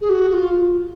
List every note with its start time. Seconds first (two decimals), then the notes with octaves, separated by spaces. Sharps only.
0.01 G#4
0.09 F#4
0.30 F#4
0.33 F4